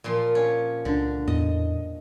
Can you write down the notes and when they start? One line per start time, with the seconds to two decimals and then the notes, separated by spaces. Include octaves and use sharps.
0.04 A#2 F3 C6
0.35 C#4
0.85 C#2 D3 D4
1.28 E2 A2 D#5